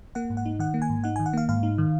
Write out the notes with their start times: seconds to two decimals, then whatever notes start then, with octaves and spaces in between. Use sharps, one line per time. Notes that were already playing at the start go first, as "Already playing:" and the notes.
0.15 A#3 F#5
0.30 G#2
0.37 F#5
0.46 D#4
0.59 D#3 F#5
0.74 A#3
0.82 G#5
0.90 G#2
1.04 D#4 F#5
1.16 D#3 G#5
1.26 F#5
1.33 A#3 F5
1.49 G#2 F5
1.63 D#4
1.78 D#3